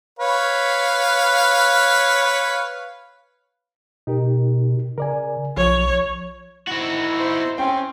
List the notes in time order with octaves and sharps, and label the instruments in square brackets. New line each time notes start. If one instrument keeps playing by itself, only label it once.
[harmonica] B4 C#5 F5
[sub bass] B2 [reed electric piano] D#4 G4 A#4
[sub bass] C#3 [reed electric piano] A#4 D5 G#5
[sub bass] B1 [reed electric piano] F3 [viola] C#5
[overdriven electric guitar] C4 F#4 [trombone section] D#4 E4
[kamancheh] C5
[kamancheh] C4 C#4 [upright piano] G5